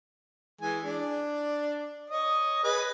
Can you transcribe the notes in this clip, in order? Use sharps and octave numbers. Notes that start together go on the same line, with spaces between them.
E3 G#3 G#5
D4 D5
C#5 D#5 D#6
G#4 B4 D#5